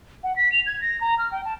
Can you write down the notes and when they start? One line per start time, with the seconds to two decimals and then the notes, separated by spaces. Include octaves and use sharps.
0.23 F#5
0.36 B6
0.52 F7
0.66 G#6
0.81 A#6
1.01 A#5
1.18 F6
1.32 G5
1.45 A5